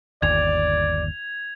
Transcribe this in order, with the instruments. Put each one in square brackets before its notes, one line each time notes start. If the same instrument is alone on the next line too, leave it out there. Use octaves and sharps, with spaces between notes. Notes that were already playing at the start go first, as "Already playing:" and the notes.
[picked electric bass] G1 D#2 [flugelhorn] D5 [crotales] G#6 F7